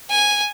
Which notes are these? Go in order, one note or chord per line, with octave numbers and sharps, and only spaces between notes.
G#5